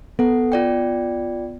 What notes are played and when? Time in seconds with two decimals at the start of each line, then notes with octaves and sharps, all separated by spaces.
0.19 B3 A4 F#5
0.52 F4 D5 G5